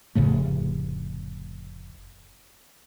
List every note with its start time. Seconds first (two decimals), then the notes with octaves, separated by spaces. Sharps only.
0.15 F1 A2 C#3 A3